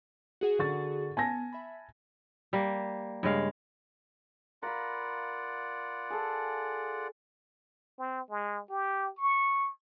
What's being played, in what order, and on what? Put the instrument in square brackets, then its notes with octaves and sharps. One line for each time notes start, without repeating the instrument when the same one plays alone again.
[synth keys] F#4 G#4 F#5
[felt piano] D3 C#6 A6
[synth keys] B3 [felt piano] G#5 A5 A#6
[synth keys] E5 B5
[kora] G3 A#3
G2 C#3 G#3 F5
[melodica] F4 D5 F#5 [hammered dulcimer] A#4 F5 B5
[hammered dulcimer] G#4 A4
[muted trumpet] C4
G#3
G4
C#6